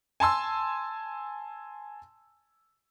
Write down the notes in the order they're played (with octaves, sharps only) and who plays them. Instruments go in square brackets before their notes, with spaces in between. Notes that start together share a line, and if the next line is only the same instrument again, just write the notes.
[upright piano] G#5 A5 C6 E6